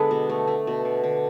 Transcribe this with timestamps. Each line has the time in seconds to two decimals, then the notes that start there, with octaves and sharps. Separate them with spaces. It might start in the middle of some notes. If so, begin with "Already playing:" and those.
Already playing: D3 G#3 B3 A4 B4
0.11 B2
0.29 A3
0.47 A3
0.67 B2
0.85 D3
1.04 D3